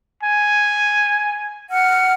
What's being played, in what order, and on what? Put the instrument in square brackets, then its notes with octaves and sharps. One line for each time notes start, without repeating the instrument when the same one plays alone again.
[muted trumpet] G#5
[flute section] F#5 F6